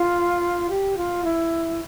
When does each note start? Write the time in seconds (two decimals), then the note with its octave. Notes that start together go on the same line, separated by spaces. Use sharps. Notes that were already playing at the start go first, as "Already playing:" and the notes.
Already playing: F4
0.70 G4
0.97 F4
1.24 E4